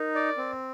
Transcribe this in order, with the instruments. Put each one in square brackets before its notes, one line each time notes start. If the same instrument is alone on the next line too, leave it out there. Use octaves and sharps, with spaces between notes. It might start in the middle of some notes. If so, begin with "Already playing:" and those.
Already playing: [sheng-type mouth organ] D#4 [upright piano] A#4
[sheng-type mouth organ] D5
C4